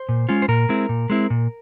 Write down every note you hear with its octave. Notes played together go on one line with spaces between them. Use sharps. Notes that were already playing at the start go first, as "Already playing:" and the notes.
Already playing: C5
A#2
G#3 C#4 F4
C5
A#2 A#4
G#3 C4 E4
A#2
G#3 C4 E4
A#2